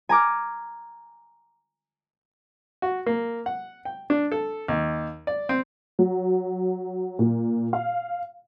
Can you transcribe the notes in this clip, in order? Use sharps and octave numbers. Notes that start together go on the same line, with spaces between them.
G#5 A#5 D6 F6
F#4
A#3
F#5
G5
D4
A4
D#2
D5
C4
F#3
A#2
F5